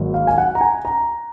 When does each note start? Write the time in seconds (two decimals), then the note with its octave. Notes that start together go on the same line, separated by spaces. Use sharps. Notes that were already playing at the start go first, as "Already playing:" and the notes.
Already playing: G#1 G#2 F#3 A#3
0.14 F5
0.27 G#5
0.38 F#5
0.55 A#5
0.61 G#5
0.85 A#5